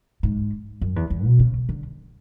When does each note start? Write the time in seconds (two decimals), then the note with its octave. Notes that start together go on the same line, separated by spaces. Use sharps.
0.23 G#2
0.81 F#2
0.96 E2
1.10 E2
1.24 B2
1.39 C#3
1.69 D3